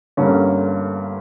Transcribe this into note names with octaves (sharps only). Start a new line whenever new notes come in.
G1 G2 D3 A#3 C#4